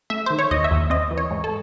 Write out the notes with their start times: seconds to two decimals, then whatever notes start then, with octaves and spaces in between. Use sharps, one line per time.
0.10 A3 E5
0.26 D#3 C5
0.39 C#5
0.51 D#2 D#5
0.64 E5
0.71 D#2
0.90 C4 D#5
1.11 E3
1.18 C#5
1.31 G#2
1.44 A4